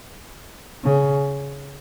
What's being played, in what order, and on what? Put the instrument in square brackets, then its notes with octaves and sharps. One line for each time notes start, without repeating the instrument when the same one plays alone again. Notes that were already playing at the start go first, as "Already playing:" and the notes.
[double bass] C#3